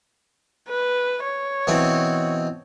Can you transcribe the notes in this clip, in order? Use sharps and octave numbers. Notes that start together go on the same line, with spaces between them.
B4
C#5
B2 E3 C4